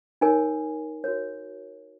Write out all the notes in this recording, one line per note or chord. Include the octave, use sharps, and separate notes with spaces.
D#4 A#4 C#5 G#5
F#4 A#4 C#5